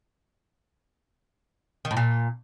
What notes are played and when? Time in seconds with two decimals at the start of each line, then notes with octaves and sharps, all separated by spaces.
1.85 D#3
1.91 A2
1.97 A#2